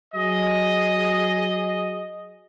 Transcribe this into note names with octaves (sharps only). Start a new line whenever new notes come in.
F#3 G#4 D#5